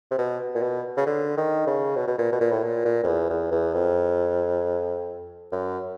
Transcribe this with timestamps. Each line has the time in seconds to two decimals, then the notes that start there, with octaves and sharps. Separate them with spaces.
0.11 C3
0.18 B2
0.55 A#2
0.62 B2
0.97 C#3
1.06 D3
1.37 D#3
1.67 C#3
1.96 B2
2.07 B2
2.18 A#2
2.32 B2
2.41 A#2
2.51 A2
2.63 A#2
2.85 A#2
3.03 F2
3.07 E2
3.30 E2
3.51 E2
3.73 F2
5.52 F#2